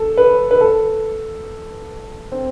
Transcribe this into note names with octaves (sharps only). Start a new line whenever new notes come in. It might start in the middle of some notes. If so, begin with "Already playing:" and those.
Already playing: A4
B4
B4
A4
C4